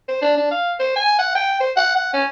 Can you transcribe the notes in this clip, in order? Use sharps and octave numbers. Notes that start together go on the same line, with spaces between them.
C5
D4
D4
F5
C5
G#5
F#5
G5
C5
F#5
F#5
C#4